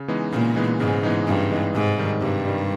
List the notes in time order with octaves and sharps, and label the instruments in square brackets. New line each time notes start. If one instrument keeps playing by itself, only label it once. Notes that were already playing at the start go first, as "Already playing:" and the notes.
Already playing: [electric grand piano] C#3
E3 G#3 B3 D#4
[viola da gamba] A#2 [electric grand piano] C#3
[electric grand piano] E3 G#3 B3 D#4
[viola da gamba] G#2 [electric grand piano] C#3
[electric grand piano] E3 G#3 B3 D#4
[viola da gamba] G2 [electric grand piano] C#3
[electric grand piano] E3 G#3 B3 D#4
[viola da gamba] G#2 [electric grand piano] C3
[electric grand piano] D#3 G3
[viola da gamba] G2 [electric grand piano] C3
[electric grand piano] D#3 G3